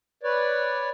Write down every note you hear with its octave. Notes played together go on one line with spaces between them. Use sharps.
B4 C#5 D5